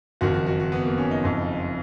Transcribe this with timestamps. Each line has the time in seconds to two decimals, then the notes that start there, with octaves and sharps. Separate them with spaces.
0.21 F#1 F2 D#3 F#4
0.34 F#4
0.46 F#4
0.60 F#4
0.72 B3
0.86 A#3
0.98 C#4
1.11 D#4
1.23 F#1 F2 C#3